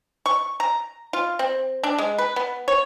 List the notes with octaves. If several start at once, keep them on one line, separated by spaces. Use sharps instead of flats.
C#6
A#5
F4
C4
D4
G#3
B4
B3
C#5